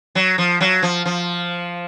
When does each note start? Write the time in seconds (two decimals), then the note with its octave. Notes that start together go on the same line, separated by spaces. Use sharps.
0.15 F#3
0.38 F3
0.61 F#3
0.83 F3
1.06 F3